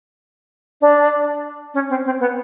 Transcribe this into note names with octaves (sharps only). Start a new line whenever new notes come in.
D4
C#4
C4
C4
B3